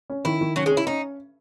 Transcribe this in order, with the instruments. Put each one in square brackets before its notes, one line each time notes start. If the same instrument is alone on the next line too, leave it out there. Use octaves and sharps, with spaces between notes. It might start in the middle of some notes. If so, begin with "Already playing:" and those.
[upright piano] C#4
[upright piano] D#3 [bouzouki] E4
[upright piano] D#3
[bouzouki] F#3 [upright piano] C#4
[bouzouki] G#3
[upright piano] C#4
[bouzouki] E4
[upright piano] C#4 [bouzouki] D#4